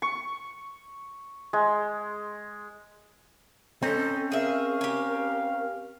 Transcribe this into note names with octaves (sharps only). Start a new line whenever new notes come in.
C#6
G#3
C4 C#4 D#4 A4 C5
G#4 A#4 E5 F5
G4 G#5